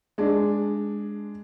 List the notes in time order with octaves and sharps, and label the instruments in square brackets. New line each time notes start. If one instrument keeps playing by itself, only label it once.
[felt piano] G#3 D4